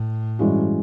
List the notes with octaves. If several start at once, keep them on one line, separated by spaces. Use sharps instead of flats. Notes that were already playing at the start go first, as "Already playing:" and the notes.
Already playing: A2
G2 E3 G#3 C#4 F#4